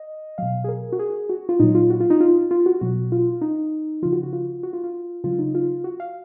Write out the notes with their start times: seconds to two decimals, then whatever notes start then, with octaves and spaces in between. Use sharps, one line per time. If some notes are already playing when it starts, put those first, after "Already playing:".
Already playing: D#5
0.38 B2 F#3 F5
0.64 G#4
0.69 A#4
0.92 F#4
0.99 G#4
1.29 F#4
1.49 F4
1.60 A#2 F#3 D#4
1.75 F4
1.90 F#4
2.00 F4
2.10 D#4
2.20 F4
2.51 F4
2.66 F#4
2.81 B2 F#3 F#4
3.12 F4
3.41 D#4
4.02 C#3 F3 F4
4.13 F#4
4.23 F#4
4.33 F4
4.63 F#4
4.73 F4
4.84 F4
5.24 C#3 F#3 F4
5.39 D#4
5.55 F4
5.84 F#4
6.00 F5